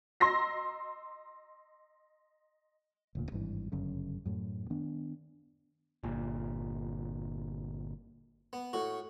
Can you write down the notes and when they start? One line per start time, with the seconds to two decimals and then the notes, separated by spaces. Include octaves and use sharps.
0.20 D#5 A#5 C6 E6 A#6 C7
3.15 E1 D2 A#2
3.32 G#1 G2 E3
3.72 G1 F#2 C#3
4.26 F#2 A2
4.70 D#3 B3 D4
6.04 G1 A#2
8.53 B3
8.73 A2 F#4